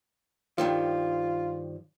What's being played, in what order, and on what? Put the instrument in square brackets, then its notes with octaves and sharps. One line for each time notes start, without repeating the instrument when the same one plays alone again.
[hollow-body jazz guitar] G2 D#3 F3 [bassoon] F4